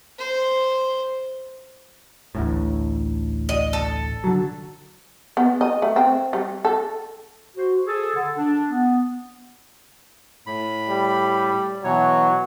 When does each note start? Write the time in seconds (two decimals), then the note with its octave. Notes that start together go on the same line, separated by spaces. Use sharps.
0.18 C5
2.35 A1 D2 A2
3.49 D#5
3.73 A4
4.24 D3 F#3
5.37 B3
5.61 D#5
5.82 A3
5.96 C4
6.33 G3
6.65 A4
7.57 F#4 C5
7.86 G#4 A4
8.16 D3 A4
8.37 D4
8.71 B3
10.47 A2 B5
10.89 G3
11.84 B2 E3 F#3 C#5